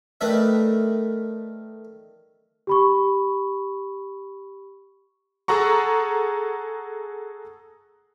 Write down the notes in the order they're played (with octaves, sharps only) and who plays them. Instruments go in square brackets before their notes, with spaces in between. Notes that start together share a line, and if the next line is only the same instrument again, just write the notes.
[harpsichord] D#3 A3 D4 B4 E5
[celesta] G4 B5 C#6
[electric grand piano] G#4 A4 F#5 A#5 C#6